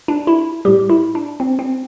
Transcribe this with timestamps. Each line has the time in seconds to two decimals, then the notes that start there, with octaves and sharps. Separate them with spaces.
0.08 D4
0.27 E4
0.65 A2 G3 G4
0.90 E4
1.15 D4
1.40 C4
1.59 C4